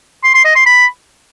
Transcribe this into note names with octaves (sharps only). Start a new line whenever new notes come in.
C6
C6
D#5
C6
B5